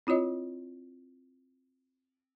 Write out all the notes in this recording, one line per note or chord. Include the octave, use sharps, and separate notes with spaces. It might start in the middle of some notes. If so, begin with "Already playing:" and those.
C4 E4 F4 C#5 D#5